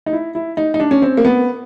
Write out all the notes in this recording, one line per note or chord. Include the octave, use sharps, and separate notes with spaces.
D#4
E4
E4
D#4
D#4
D4
C#4
C4
A#3
B3